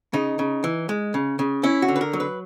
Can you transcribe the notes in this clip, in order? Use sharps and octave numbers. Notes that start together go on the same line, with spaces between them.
C#3 D#4
C#3
E3
G#3
C#3
C#3
C#4 E4
F#4
D3
B4
A#4
F#3
B4